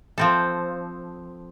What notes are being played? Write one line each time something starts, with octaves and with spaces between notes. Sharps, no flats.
F3 C4 A4